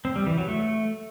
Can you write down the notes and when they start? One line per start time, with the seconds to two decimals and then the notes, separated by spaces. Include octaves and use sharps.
0.05 C4
0.16 G3
0.27 E3
0.37 F#3
0.48 A3